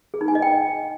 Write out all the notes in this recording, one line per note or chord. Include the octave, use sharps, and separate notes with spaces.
G#4
D#4
G#5
D#5
G5